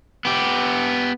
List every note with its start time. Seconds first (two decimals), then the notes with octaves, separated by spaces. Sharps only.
0.25 B3 G4